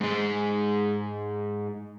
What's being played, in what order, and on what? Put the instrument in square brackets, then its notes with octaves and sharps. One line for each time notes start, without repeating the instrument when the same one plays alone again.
[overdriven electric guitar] G#2 G#3